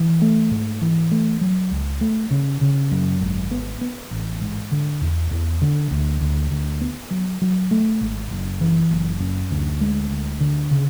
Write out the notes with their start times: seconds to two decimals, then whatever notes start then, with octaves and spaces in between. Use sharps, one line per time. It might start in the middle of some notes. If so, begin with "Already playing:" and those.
Already playing: E3
0.22 A3
0.51 G#2
0.82 E3
1.11 A3
1.41 F#3
1.71 C#2
2.01 A3
2.31 C#3
2.61 C#3
2.91 F#2
3.21 G#1
3.51 B3
3.81 B3
4.11 A1
4.41 G#2
4.71 D3
5.01 E2
5.31 E2
5.61 D3
5.91 D2
6.21 D2
6.51 D2
6.81 B3
7.11 F#3
7.42 F#3
7.71 A3
8.01 G#1
8.31 F#1
8.61 E3
8.91 F#1
9.20 F#2
9.51 D2
9.81 G#3
10.11 D2
10.41 D3
10.71 C#3